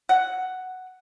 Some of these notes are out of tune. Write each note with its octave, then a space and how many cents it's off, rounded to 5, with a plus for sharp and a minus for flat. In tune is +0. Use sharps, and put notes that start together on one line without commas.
F#5 +5